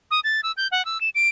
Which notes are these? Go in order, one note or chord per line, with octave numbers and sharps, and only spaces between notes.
D#6
A6
E6
G6
F#5
E6
E7
D7